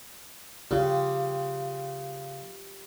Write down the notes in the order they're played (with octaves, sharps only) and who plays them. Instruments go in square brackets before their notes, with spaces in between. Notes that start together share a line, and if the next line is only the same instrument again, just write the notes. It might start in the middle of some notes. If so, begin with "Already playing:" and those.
[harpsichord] C#3 [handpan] F4 G4